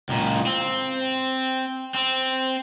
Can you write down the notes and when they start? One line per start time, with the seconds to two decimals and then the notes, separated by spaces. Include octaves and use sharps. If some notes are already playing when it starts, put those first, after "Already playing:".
0.09 C#2 A#2
0.46 C4
1.94 C4